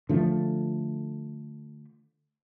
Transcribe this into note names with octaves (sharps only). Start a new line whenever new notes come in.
D3 F3 A3